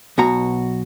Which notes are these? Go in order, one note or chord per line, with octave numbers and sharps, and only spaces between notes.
B1 B2 F#4 A#5